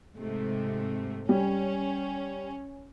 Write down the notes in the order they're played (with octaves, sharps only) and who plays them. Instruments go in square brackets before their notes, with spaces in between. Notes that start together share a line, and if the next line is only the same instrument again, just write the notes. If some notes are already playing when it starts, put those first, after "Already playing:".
[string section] G#2 C3 A3
[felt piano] G3 [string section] C#4